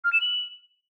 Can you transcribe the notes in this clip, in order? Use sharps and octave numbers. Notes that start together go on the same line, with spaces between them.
F6
E7
F#7